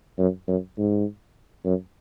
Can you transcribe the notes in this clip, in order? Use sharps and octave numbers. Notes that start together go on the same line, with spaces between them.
F#2
F#2
G#2
F#2